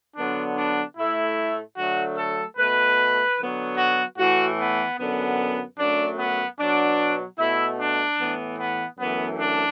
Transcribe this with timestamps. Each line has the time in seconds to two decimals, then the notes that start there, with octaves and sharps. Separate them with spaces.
0.17 D3 F#3 B3 D4
0.57 D4
0.97 A2 A3 E4
1.77 D3 F#3 A3 F#4
2.17 A4
2.57 B2 A3 B4
3.38 D3 F#3 B3
3.77 F#4
4.18 A2 E3 A3 F#4
4.58 B3
4.98 F#2 D3 B3
5.78 F#2 F#3 A3 D4
6.18 B3
6.59 B2 F#3 B3 D4
7.39 B2 A3 E4
7.79 D4
8.19 A2 E3 B3
8.59 B3
8.99 F#2 E3 A3 B3
9.39 D4